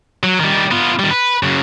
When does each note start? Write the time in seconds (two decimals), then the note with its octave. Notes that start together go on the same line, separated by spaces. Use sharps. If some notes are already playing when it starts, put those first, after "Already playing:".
0.23 F#3
0.40 D#3 G3
0.71 B3 F4
0.99 D#3 G3
1.11 B4
1.43 F#2 C#3